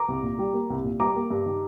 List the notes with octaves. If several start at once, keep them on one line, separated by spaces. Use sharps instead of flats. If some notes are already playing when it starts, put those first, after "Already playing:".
Already playing: A#5 D6
C2
A#2
G3
A#3
C2
A#2
G3 A#5 D6
A#3
G2
D#3